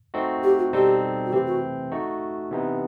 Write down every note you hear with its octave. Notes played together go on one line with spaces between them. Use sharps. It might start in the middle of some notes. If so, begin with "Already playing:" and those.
A3 C4 D#4 F#4
G4
F#4
B2 G3 C4 D#4 G4 A4
F#4
C3 E3 A3 C4 G4
F#4
A3 D#4 F#4
C3 E3 B3 D#4